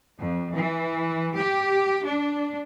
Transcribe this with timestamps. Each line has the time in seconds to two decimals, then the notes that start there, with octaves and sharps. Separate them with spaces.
0.19 F2
0.55 E3
1.37 G4
2.05 D4